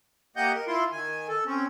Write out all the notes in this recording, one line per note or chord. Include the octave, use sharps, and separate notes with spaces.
A#3 G4 D#5 F#5 G6
A#4
E4 F4 C6
D#3 G#5
A4
C4 C#4